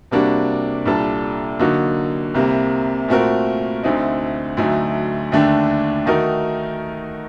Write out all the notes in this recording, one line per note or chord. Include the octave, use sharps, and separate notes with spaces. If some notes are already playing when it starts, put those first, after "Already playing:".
C3 G3 A#3 D4 F#4
C2 A#2 G3 D4 A4
D3 F#3 A#3 D#4 F#4
C2 C3 G3 A#3
A#2 A3 C4 F#4 A#4
D2 D3 A3 C4 D#4
D2 D3 F#3 A3 D#4
D#2 D3 A3 D4
D#3 A3 D#4 F#4 A#4